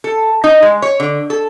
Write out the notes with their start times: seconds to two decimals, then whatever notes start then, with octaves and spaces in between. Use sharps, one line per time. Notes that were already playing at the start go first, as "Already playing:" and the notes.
0.04 A4
0.44 D#4
0.62 G#3
0.82 C#5
1.00 D3
1.30 A4